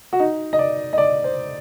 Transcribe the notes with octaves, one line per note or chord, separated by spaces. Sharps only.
F#4
D#4
D#5
D5
D#5
D5
C5